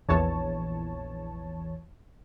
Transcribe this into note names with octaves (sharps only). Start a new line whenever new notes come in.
A#1 E2 E3 C#5 A5